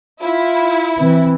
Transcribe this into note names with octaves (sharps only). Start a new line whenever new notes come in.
E4 F4
E3 C4